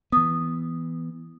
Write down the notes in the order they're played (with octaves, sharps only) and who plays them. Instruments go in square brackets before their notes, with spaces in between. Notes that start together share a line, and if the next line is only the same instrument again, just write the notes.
[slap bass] E3 B3 [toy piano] D#6